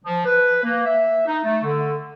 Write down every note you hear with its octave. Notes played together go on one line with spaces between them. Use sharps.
F3
B4
A#3
E5
D#4
A3
D3